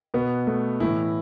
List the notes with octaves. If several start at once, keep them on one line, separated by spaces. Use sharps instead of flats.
B2 B3
A3
A2 E3 E4